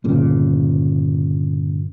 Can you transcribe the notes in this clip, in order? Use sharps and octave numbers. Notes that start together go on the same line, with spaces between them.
G1 A#2 C#3